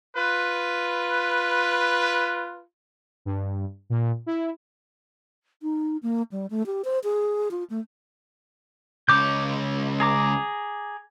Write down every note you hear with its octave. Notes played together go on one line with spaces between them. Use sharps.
F4 B4
G2
A#2
E4
D#4
A#3
G3
A3
G4
C5
G#4
F4
A3
C#2 C#5 D6 G6
G#4 A#5 D6